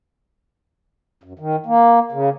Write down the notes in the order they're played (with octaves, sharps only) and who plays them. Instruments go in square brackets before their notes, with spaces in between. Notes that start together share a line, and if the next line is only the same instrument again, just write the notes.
[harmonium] F#2
D#3
A#3
C#3